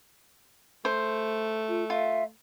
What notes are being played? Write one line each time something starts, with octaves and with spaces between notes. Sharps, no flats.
A3 C5
F4
F4 E5